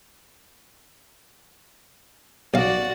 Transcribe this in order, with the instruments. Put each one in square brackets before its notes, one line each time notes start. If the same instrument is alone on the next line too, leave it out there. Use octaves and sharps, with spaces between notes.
[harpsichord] B1 F5 [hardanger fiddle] F#4 D5